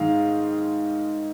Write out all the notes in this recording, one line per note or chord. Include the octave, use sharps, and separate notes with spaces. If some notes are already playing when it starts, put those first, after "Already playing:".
Already playing: G#2 D#3 G#3 F5